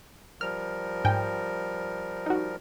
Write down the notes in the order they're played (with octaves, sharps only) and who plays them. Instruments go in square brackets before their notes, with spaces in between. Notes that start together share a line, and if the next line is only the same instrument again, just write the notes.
[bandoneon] F3 G3 A#4 [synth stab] F6
[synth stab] G#2 G5 G#5
D#4 F#4